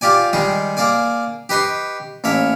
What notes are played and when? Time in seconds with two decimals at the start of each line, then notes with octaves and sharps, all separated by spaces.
0.01 F4 G4 D5 G#5
0.33 D#3 G3 G#3 G#4
0.77 A#3 G#4 D5 G#5
1.49 G4 B4 D#5 C6 C#6
2.24 A1 A#3 C#5 E5